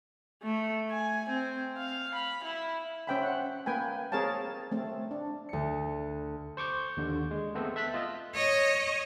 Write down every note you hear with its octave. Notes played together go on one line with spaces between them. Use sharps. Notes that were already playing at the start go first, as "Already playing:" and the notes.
A3
G#5
C4
F5
B5
E4
C#4 C5 E5 G5 G#5 B5
F#5
A#3 B4 G5 G#5
C4 G#4 A#4 C#5 F5 A5
A3 C4
D4
D2 C#7
C5 C#6 D6 G6
D#2 D3
G#3
A3 B3 C4 A4 C5
E5 A5 F#6 B6
F4 D#5
C#5 D#5